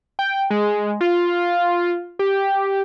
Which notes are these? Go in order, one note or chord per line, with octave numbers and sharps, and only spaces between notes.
G5
G#3
F4
G4